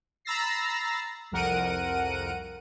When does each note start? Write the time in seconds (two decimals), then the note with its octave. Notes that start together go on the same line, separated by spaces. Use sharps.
0.25 A#5 B5 E6 A6 A#6 C7
1.31 C2 F2 A#4 F#5 D7 D#7